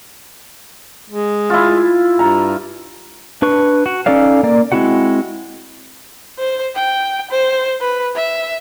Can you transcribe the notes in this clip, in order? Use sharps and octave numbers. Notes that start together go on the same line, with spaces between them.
G#3
E4 F4
G2 A#5
D4 B4 C#6
F#4
C#4 D#4 A4 D5 F5
A#3 D5
G#3 C4 E4 F#4 F#5
C5
G5
C5
B4
E5